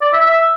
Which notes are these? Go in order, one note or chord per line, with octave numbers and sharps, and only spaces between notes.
D5
E5
E5